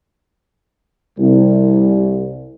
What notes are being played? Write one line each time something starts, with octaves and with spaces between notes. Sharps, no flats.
C2